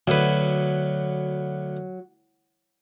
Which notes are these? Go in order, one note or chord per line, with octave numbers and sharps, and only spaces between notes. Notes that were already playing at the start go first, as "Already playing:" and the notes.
D2 F#3 B4